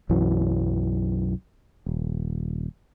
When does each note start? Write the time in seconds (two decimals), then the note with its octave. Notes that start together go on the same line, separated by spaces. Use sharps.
0.09 B1 F#2 E3 F#3
1.86 D#1